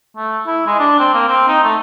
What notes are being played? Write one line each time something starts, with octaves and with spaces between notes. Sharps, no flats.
A3
E4
G#3
D4
C4
A#3
C4
D#4
A3